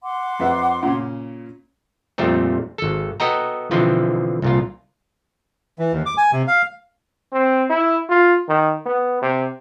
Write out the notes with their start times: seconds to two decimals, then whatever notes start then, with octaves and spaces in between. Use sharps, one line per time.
0.03 F#5 C6 D6
0.40 F2 B4 E5
0.83 A#2 C#3 C#4
2.18 F2 A#2 G3 A3 C4
2.78 G#1 A4
3.20 B3 F#4 A4 D#5 G5 A#5
3.71 B2 D3 E3 F3 C4 F4
4.42 C2 A#2 F4
5.79 E3
5.93 D#2
6.06 D6
6.18 G#5
6.32 C3
6.48 F5
7.32 C4
7.70 E4
8.09 F4
8.48 D#3
8.86 B3
9.22 C3